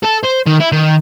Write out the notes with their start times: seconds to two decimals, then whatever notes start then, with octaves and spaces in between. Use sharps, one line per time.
0.04 A4
0.24 C5
0.47 D#3
0.60 E4
0.72 D#3